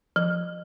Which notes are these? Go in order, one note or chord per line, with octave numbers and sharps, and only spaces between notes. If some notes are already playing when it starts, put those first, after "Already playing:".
F3